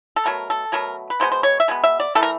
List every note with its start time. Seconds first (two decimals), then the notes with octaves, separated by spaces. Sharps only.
0.16 A4
0.26 B2 F#3 A3 A#4
0.50 A4
0.72 B2 F#3 A3 A#4
1.10 B4
1.20 B2 G#3 B3 C5
1.32 C5
1.43 C#5
1.60 E5
1.68 B2 G#3 B3
1.84 E5
2.00 D5
2.15 E3 A3 A4
2.23 A#4